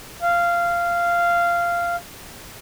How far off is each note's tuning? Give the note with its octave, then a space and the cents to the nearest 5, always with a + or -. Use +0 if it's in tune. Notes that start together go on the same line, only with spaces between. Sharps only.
F5 -15